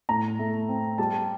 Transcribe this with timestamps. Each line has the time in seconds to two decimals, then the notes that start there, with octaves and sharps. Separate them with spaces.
0.09 A2 A#5
0.39 A3
0.69 C4
0.98 G3 A5